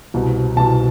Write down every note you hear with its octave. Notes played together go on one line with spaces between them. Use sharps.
C2 B2
C2 B2 A5